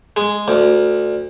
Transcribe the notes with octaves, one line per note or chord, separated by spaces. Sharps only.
G#3
D2